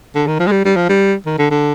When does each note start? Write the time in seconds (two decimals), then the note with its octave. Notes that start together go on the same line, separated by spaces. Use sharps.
0.15 D3
0.27 D#3
0.39 F3
0.47 G#3
0.51 G3
0.65 G3
0.76 F3
0.89 G3
1.26 D#3
1.38 D3
1.51 D3